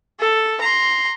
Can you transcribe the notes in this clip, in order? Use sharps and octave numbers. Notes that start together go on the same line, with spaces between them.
A4
A#5 C6